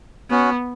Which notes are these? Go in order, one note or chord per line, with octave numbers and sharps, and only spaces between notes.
B3 C#4 F#4